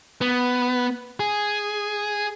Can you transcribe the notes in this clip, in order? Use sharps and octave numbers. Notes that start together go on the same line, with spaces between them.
B3
G#4